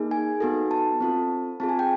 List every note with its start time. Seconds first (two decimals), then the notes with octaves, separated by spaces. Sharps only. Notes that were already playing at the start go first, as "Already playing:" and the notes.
Already playing: A#3 D#4 G#4
0.11 G#5
0.40 B3 D#4 F#4 A4
0.71 A5
1.01 C4 F4 A4
1.60 C4 F4 G#4 A5
1.69 G#5
1.79 G5